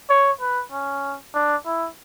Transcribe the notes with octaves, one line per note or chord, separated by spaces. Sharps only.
C#5
B4
C#4
D4
E4